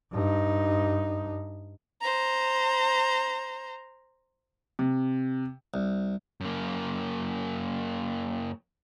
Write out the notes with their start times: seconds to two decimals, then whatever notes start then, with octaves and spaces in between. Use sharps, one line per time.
0.13 G2 D#4
2.01 C5 A#5
4.79 C3
5.74 C2
6.41 F#2 A#3